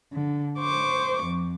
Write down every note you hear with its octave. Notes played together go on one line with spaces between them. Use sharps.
D3
C5 C#6 D6
F2